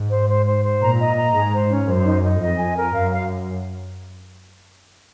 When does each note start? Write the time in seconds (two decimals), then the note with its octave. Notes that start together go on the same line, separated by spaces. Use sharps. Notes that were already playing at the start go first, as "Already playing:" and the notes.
Already playing: G#2
0.11 C5
0.29 C5
0.46 C5
0.64 C5
0.81 A#2 A#5
0.99 D#5
1.17 A#5
1.34 G#2 G#4
1.52 C5
1.70 C#4
1.87 F#2 C5
2.05 D#4
2.23 D#4
2.41 F2 D#5
2.58 G#5
2.76 A#4
2.93 F#2 F5
3.11 F5